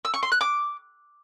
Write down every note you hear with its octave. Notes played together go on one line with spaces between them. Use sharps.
E6
C#6
C6
F#6
D6